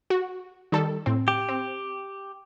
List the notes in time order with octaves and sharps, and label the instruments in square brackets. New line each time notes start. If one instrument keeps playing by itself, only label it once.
[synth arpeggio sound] F#4
D#3 G3 A4
A2 C4
[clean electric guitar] G4
[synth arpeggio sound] C4